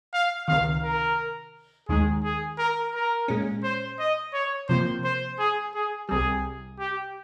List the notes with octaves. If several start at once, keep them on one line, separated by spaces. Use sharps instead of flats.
F5
C#2 C3 D#3 F5
A#4
D#2 D#3 G#3 G#4
G#4
A#4
A#4
A#2 G#3 C#4
C5
D#5
C#5
C3 F3 A#3 C5
C5
G#4
G#4
C2 C3 G3 G#4
G4